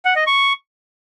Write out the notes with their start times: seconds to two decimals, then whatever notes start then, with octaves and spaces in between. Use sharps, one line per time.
0.05 F#5
0.16 D#5
0.27 C#6